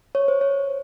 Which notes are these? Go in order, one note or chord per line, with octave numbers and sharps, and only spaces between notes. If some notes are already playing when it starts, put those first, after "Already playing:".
C#5
C5
C#5